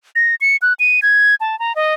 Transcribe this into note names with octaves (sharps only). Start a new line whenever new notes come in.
A#6
C#7
F#6
D#7
G#6
A5
A#5
D#5